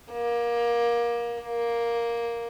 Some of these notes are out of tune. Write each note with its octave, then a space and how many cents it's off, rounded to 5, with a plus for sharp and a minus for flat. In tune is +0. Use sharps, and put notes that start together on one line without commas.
A#3 +20
A#3 +5